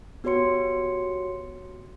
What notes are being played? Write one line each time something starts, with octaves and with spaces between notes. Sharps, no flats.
B3 F#4 G4 C#5 C6 C#7